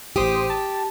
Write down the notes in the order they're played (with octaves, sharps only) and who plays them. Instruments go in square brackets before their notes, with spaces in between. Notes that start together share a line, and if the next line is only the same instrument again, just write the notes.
[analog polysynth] A1 C5 D#6 [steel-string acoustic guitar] G4
[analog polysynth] A5